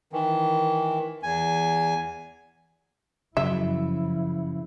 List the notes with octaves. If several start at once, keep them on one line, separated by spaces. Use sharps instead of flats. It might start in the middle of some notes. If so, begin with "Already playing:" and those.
D#3 E3
E2 G#5
F#2 C#3 F3 E4 E5